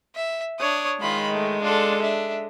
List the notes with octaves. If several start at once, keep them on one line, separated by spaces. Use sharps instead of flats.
E5
D4 C#5 D#6
D#3 G#3 F4 B5
A3
D4 F4 A4
D4 E5